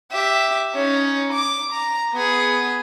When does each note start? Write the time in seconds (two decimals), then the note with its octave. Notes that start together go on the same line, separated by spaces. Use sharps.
0.12 G4 E5
0.75 C#4 D#4
1.33 D6
1.73 A#5
2.14 B3 G#4